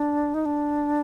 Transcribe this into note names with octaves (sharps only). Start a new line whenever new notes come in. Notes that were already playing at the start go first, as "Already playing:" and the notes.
Already playing: D4
D#4
D4